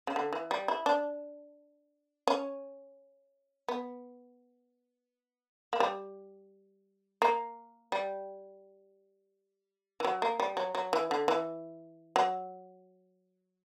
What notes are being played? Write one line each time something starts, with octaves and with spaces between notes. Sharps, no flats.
C#3
D3
E3
G3
E4
D4
C#4
B3
A#3
G3
A#3
G3
E3
F#3
A#3
G3
F#3
F#3
E3
D3
E3
F#3